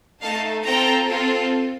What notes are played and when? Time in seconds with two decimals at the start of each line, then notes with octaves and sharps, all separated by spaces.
0.21 A3 D#4 A4 F5 A5
0.64 C4 F4 A4 G5 A#5
1.07 C4 F4 A4